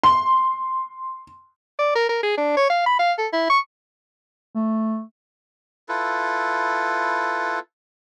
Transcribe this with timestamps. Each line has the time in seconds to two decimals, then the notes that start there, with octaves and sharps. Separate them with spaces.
0.03 C6
1.79 D5
1.95 A#4
2.09 A#4
2.23 G#4
2.37 D4
2.57 C#5
2.70 F5
2.86 B5
2.99 F5
3.18 A4
3.33 E4
3.50 C#6
4.55 A3
5.89 E4 F4 A4 B4